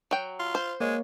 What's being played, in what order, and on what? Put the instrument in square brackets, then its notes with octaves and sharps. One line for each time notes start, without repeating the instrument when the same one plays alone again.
[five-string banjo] F#3 G5
[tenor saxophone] F4
[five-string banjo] C5
[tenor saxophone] G#3 [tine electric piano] A#3 C#5